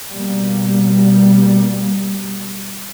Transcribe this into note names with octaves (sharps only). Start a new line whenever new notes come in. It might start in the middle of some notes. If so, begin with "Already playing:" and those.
B2 G3 A#3